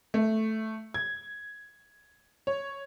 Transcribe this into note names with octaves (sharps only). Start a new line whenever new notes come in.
A3
G#6
C#5